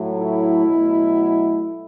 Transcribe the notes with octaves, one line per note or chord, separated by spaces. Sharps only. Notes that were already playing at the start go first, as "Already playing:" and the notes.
Already playing: A2 F#3 A3
E4
B2 F#3 A3